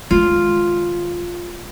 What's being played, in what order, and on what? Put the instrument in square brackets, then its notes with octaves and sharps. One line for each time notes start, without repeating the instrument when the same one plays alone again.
[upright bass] D#3 G#3 [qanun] F4